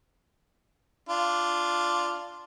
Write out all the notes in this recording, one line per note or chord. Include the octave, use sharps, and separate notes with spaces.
D4 F4